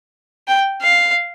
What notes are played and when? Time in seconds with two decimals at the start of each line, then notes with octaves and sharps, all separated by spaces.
0.47 G5
0.81 F5